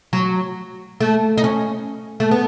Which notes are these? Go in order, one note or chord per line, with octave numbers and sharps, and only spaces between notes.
F#3
A3
D#4
C#4
A3
B3